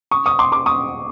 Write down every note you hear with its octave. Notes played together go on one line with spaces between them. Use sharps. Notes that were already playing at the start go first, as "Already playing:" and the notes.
C#6 D#6
C#6 D#6
C6 D6
C6 D6
C#6 D#6